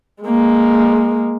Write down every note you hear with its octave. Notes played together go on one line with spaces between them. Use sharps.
G#3 A#3